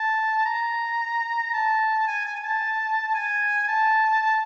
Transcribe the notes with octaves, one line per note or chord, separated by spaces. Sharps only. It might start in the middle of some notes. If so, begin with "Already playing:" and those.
Already playing: A5
A#5
A5
G#5
G#5
G#5
A5
G#5
A5
A5